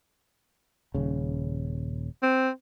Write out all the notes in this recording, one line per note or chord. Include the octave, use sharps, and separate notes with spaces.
D#1 C#3
C4